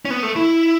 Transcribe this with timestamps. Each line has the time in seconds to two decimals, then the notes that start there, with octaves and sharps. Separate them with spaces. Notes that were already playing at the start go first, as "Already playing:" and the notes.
0.05 C#4
0.11 B3
0.23 A3
0.36 E4